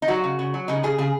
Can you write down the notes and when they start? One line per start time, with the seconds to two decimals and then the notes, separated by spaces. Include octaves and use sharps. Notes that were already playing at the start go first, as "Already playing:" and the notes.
0.02 D#4
0.08 F#3 F#4
0.24 C#3
0.39 C#3
0.54 F#3
0.68 C#3 D#4
0.83 C#3 G#4
0.98 C#3 G#4